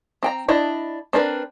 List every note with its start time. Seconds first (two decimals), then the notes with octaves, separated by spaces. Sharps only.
0.23 C4 G5 A#5
0.48 D4 E4 D#5
1.13 C4 D4 A#4 B4